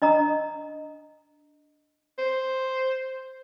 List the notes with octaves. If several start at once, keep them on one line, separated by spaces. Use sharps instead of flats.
D4 D#5 A#5 D#6
C5